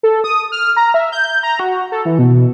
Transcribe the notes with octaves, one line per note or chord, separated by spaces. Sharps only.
A4
D#6
F6
A#5
E5
G6
A#5
F#4
A4
E3
B2